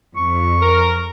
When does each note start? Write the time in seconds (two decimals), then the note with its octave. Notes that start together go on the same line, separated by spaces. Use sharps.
0.16 F2 C#6
0.61 A#4